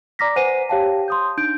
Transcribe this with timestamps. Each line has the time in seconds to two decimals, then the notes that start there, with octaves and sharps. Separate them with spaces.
0.19 D5 A#5 D6 F6 A#6 B6
0.36 B4 C5 F#5 G#5 C7 D#7
0.69 G4 C#5 F5 G5 A5
1.08 C6 D#6 G6
1.37 D4 D#4 G6 D7